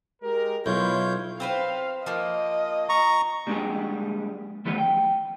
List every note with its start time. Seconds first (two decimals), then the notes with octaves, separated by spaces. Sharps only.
0.22 G#3 G4 A#4
0.66 B1 E4 F4 C#5 G6
1.40 C4 B4 C5 F5
2.06 F3 A#3 D#5
2.89 A#5 C#6
3.47 G3 G#3 A#3 D4 G4 G#4
4.65 D#3 E3 G3 A3 B3
4.78 G5